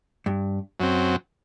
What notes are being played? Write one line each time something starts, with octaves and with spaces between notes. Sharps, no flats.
G2
F#2 F#3 C4